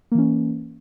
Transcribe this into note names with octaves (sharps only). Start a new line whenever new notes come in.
E3 A#3 C#4